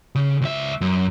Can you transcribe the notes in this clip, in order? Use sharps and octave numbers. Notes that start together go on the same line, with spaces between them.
C#3
C#2 E5
F#2